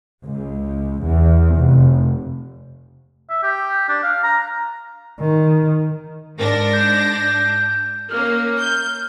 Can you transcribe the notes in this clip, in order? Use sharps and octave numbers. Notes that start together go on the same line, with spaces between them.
C#2
E2
F1
E5
G4
D4
F5
A#5
D#3
G#2 D4 A#4 A#6
G6
A#3 C#4 F6
G6